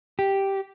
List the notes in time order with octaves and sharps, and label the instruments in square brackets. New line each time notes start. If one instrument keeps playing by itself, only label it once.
[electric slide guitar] G4